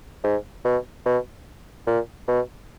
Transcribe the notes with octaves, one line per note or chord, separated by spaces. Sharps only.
G#2
B2
B2
A#2
B2